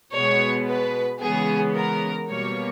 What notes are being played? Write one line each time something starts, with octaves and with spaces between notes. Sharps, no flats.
B2 G#3 B3 C#5
B4
C#3 E3 G#3 B3 G#4
A#4
B2 G3 A#3 C#5